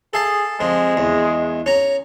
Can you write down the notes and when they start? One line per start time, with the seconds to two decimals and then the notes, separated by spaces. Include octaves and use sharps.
0.14 G#4 A4 F5 A5
0.60 F2 F3 G#3
0.97 E2
1.66 C#4 A#5